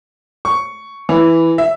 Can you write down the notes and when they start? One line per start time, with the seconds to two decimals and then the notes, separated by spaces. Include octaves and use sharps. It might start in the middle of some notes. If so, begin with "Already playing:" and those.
0.45 C#6
1.09 E3
1.58 E5